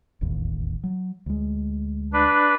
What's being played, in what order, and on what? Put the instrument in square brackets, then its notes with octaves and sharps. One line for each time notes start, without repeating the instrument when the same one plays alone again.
[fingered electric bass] E1 A1 D#2
F#3
D2 G#3
[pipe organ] D4 B4